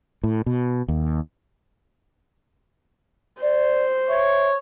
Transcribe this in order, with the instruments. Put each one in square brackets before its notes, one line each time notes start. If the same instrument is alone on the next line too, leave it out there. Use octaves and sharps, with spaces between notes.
[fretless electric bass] A2
B2
D#2
[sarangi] C5 [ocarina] D5
[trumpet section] C#5 [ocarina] E5